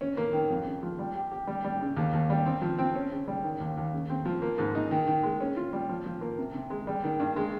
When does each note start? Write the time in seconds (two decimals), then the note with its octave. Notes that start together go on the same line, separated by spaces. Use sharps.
0.01 C#4
0.17 A#3
0.33 D#3
0.50 F2
0.66 C#3
0.83 F3
0.99 G3
1.15 G4
1.31 G4
1.47 G3
1.64 G3
1.81 C#3
1.97 D#2
2.13 D#2
2.30 G3
2.46 C4
2.62 F3
2.79 C4
2.95 C#4
3.11 C#3
3.28 G3
3.44 D#3
3.60 D#2
3.77 D#2
3.93 C#3
4.10 C4
4.25 F3
4.42 A#3
4.58 G#2
4.75 D#4
4.91 D#3
5.08 D#3
5.23 G#3
5.40 C#4
5.57 F4
5.73 G3
5.89 F3
6.06 F3
6.21 A#3
6.39 C3
6.54 C3
6.70 G#3
6.87 G3
7.04 D#3
7.20 G2
7.36 G#3